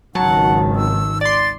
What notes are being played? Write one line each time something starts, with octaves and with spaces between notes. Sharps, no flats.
G#1 C#2 D#3 F#3 F#5 A5
E6
D5 C6 A6